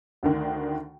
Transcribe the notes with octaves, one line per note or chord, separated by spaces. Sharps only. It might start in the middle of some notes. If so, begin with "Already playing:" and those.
D2 D3 D#3